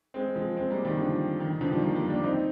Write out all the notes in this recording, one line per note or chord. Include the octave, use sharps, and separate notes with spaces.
G#3 C4
F3 G#3
G#3 C4
G3 A#3
D#3 G3
D3 F3
D#3
D#3
D3 F3
D#3 G3
G3 A#3
G3 A#3
A#3 D4
C4 D#4